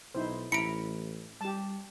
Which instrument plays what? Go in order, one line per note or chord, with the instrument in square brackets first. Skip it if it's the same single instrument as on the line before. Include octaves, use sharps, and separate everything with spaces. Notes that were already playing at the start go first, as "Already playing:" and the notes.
[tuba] B1 [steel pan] D#4 E4 C5
[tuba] A1 [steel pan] E4 A#5 B5 [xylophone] C#7 D7
[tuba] G3 [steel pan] G4 A5